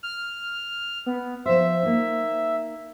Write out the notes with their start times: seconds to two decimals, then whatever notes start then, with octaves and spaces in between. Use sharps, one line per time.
0.03 F6
1.06 B3
1.46 F3 C5 E5
1.83 A#3 D#4